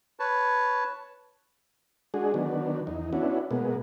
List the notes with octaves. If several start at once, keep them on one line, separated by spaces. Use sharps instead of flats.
B4 C#5 A5
G#3 D4 F#4 G#4
D#3 F#3 B3 D4
E2 D#4
B3 C#4 D4 E4 F#4
B2 G#3 A#3 B3